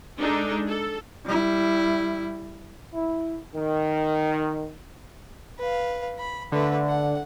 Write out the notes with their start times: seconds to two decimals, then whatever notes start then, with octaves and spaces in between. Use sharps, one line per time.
0.19 G#3 D4 D#4 A4
0.67 A4
1.25 G3 E4
2.94 E4
3.55 D#3
5.58 B4 F5
6.19 B5
6.52 D3 A3 B4
6.87 F#5